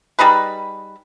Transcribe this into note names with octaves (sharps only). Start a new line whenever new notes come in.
G3 D#4 G#4 B4